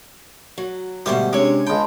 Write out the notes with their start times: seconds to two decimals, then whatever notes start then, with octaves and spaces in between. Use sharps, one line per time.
0.58 F#3
1.06 D2 G#2 B2 G3 C5 E5
1.33 C3 G#3 C#4 D4 G#4 C#5
1.67 C#2 G5 A5 B5 C6